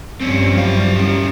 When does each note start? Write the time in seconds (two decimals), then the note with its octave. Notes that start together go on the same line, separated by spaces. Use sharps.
0.21 G2 F3 G3 C4 C#4
0.55 F#3 F5
0.96 C#4 G4